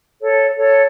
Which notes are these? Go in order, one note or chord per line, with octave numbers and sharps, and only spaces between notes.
A4 C#5
A4 C#5